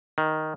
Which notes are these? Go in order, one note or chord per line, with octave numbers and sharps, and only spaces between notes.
D#3